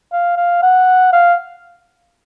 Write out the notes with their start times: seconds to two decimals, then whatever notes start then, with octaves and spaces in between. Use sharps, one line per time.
0.12 F5
0.37 F5
0.62 F#5
1.13 F5